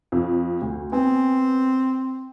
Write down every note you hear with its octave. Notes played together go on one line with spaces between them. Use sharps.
F2
D2
B3 C4 G#5